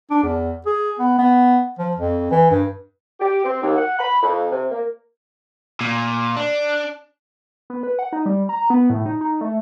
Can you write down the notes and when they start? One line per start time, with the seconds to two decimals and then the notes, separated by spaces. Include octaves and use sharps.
0.10 D4
0.23 E2
0.66 G#4
0.99 B3
1.18 B3
1.79 F3
1.96 F2
2.31 E3
2.50 G2
3.20 G4
3.44 C4
3.62 D#2
3.76 F#5
3.99 B5
4.23 F2
4.51 C3
4.70 A#3
5.81 A#2
6.36 D4
7.70 B3
7.83 B4
7.99 F#5
8.13 D#4
8.26 G3
8.49 A#5
8.70 B3
8.90 A2
9.06 D#4
9.21 D#4
9.41 A3